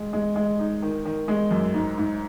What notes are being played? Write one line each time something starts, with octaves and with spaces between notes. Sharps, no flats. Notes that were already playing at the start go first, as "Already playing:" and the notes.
Already playing: G#3
G#3
G#3
D#4
D#3
D#3
G#3
F#2
G#2
G#2